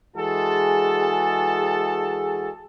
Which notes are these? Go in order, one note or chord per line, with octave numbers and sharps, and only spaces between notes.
E3 G#3 F#4 G#4 A4 A5